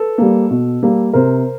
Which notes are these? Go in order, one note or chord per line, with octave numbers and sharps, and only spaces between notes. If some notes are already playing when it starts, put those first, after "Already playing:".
Already playing: A4 B4
G3 A#3
B2
G3 A#3
C3 A#4 C5